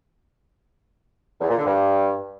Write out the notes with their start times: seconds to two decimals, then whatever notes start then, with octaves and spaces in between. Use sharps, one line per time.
1.41 E2
1.49 A#2
1.58 D3
1.66 G2